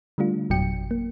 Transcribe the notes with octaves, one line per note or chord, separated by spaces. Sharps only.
D3 G3 A3 D4 F4
G#1 F2 B2 F#3 G5 C#7
A#3